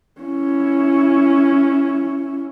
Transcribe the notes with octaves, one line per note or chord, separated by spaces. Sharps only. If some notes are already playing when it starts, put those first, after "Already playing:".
C#4 E4